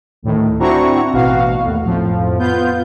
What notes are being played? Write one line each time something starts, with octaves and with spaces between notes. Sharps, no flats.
D2 A2 D#3
C4 D4 E4 F#4 A#5 C#6
A1 B2 F#4 F5
D#2 A2
F2 A2 F3
B3 F4 G6